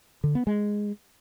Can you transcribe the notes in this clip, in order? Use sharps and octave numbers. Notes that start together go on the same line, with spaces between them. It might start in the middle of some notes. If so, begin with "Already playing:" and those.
D3
B3
G#3